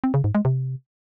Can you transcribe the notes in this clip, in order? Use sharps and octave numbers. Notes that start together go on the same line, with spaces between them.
C4
C#3
G#2
G#3
C3